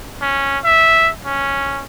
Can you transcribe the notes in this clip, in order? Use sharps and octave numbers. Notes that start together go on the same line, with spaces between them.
C#4
E5
C#4